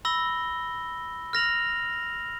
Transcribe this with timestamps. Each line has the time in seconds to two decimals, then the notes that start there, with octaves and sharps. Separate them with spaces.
0.05 B5 E6 A#6 G7
1.33 F6 A#6 F7 F#7